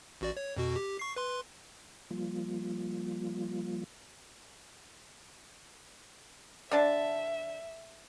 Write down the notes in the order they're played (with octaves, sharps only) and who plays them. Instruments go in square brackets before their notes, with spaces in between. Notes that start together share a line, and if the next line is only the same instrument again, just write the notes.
[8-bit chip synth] A1 F#4 D5
C#5
F2 B2 F#4
G4
C#6 C7
B4 C6
[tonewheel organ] F3 G3 A#3 F4
[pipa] D3 D4 A5 [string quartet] E5